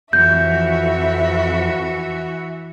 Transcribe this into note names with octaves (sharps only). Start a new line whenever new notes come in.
F2 E3 F#4 E5 G6